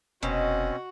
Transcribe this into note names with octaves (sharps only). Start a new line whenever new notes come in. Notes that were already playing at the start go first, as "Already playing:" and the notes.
F1 B2 C4 C#4 F#4